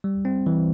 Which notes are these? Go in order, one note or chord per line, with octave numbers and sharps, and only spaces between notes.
G3
C4
E3